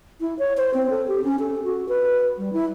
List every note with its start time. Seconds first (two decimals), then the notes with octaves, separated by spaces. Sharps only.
0.21 E4
0.39 C#5
0.57 C5
0.74 C4
0.90 A4
1.08 G4
1.24 C#4
1.39 A4
1.64 F#4
1.89 B4
2.38 G3
2.53 E4